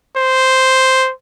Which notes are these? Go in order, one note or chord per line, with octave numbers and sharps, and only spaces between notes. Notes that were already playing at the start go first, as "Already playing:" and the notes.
C5